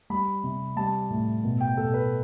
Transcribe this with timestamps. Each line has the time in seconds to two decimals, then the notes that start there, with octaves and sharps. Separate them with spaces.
0.10 G3 B5
0.44 C3
0.76 G3 A5
1.10 A2
1.44 B2
1.61 G5
1.77 B2 A4
1.94 B4